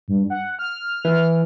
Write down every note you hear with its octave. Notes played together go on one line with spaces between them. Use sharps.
G2
F#5
F6
E3